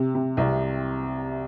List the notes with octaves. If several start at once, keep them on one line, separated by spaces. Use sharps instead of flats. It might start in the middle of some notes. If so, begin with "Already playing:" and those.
Already playing: C3
C3
C2